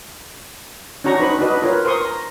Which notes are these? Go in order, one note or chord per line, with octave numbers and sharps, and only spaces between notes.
C#4 D4 F#4 A#5 C#6
D#4 B4 C5 D#5 B5 C#6
D4 F#4 B4 D#5
F4 A#4 B4 C#5
A#4 C5 C6 C#6 D#6
A#5